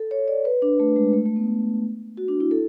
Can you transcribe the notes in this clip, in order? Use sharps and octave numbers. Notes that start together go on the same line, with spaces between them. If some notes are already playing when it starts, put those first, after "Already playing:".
Already playing: A4
C#5
D5
B4
D4
A3
G#3
A3
A3
B3
F#4
D4
E4
A4